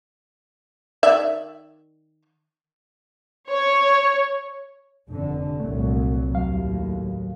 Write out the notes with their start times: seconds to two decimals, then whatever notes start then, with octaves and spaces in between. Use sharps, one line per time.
1.03 D#3 D5 E5
3.49 C#5
5.09 F1 D3
5.60 C2 A#2 F#3 A3
6.33 D#2 A2 F#3 F5